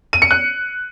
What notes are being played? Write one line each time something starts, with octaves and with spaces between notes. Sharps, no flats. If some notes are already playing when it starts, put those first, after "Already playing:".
D#7
C#7
F#6